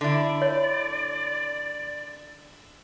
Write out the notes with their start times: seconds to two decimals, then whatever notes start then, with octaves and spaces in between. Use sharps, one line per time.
0.01 D3 E4 D5
0.42 C#5